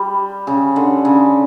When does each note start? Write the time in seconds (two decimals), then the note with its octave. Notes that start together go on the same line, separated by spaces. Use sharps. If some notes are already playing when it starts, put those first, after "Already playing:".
Already playing: G3
0.47 C#3
0.76 D3
1.05 C#3